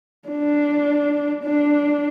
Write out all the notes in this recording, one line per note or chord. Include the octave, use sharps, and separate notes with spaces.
D4
D4